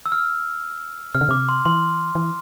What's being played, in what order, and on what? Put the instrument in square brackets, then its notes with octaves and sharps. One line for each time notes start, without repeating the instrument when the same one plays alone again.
[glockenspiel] E6
F6
[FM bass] C3 [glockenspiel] F6
[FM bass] D3
[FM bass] C3 [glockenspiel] D6
[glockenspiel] C6
[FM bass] E3 [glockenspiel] C6
[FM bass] E3